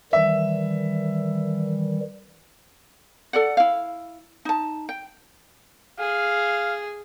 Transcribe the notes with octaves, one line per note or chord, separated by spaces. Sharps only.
D#3 E3 G3 E5
A4 D5 F#5
E4 F5
D#4 A5
G5
G#4 F5